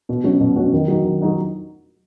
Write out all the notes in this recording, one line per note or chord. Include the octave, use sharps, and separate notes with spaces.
B2
F#3 C#4 F#4
B2
F#3 C#4 F#4
D#3
F#3 D#4 F#4
D#3
F#3 D#4 F#4